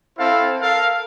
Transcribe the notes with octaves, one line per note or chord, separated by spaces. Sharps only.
C4 E4 A4 C5 F5 A5
A4 A#4 F5